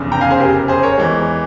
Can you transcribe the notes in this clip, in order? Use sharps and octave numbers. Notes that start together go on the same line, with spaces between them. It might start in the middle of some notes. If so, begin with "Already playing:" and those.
Already playing: F1 E2 C#3
G5 A#5
F5 G#5
G#4 C5
G4 A#4
G#4 C5
A#4 C#5
E2 E3 G#3